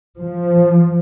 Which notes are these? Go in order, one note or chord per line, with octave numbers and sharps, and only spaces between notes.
F3